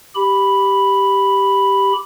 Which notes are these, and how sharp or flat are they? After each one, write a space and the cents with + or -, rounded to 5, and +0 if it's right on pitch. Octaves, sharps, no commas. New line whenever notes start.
G4 +0 B5 +0